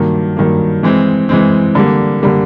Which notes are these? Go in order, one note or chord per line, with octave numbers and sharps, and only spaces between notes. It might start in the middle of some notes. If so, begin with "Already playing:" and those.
Already playing: G2 D#3 F#3 A#3
G2 D#3 F#3 A#3
E3 G#3 C4
E3 G#3 C4
D3 G3 A#3
D3 G3 A#3